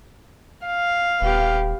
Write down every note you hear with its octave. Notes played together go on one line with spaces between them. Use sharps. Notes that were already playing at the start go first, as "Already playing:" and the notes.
F5
D#1 B3 G4